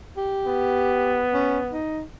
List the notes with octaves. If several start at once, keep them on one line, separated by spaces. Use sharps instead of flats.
G4
B3
C#4
D#4